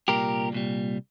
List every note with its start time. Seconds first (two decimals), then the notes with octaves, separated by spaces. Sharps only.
0.08 C2 A#2 G3 G4 A#4
0.53 C2 A#2 G3